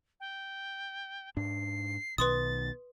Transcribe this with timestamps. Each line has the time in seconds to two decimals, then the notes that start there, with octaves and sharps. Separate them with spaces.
0.20 G5
1.37 G#2 D4 C7
2.18 B1 B2 D#3 B4 C6 D#6 A6